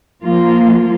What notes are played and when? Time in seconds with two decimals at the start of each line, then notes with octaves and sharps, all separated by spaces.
0.24 F3 A#3 F4